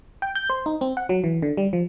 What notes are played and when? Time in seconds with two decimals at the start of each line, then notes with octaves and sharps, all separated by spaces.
0.22 G5
0.35 G6
0.50 C5
0.66 D#4
0.81 C4
0.97 F#5
1.09 F#3
1.24 E3
1.42 D3
1.57 G3
1.73 F3